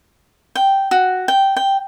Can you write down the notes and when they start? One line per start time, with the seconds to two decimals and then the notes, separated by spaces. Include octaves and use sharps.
0.55 G5
0.91 F#4
1.28 G5
1.56 G5